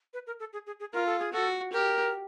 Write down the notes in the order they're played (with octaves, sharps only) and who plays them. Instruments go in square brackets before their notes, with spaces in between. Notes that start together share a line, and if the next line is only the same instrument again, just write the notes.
[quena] B4
A#4
A4
G#4
G#4
G#4
[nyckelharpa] F4 [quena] A#4
[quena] A4
G#4
[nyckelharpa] F#4 [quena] A4
[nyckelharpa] G4 [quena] A#4